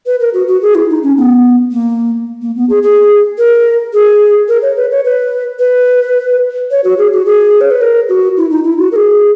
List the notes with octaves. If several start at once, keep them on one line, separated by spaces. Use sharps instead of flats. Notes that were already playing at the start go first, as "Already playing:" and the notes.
B4
A#4
F#4
F#4
G#4
E4
D#4
C#4
B3
A#3
A#3
B3
G#4
G#4
A#4
G#4
A#4
C#5
B4
C#5
B4
B4
C#5
F#4
G#4
F#4
G#4
C#5
B4
A#4
F#4
E4
D#4
E4
F#4
A#4
G#4